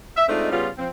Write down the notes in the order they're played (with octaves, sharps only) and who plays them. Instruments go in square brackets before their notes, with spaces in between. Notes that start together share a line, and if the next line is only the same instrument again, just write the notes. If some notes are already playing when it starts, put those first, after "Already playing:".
[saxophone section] E5
G#3 A3 C4 D4 D#4 F4
C#3 G3 B3 F4
F3 C4